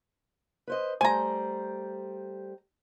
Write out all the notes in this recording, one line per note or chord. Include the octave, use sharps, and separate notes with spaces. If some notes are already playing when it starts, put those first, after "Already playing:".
B4 C5 D#5
G3 A3 C5 G#5 A#5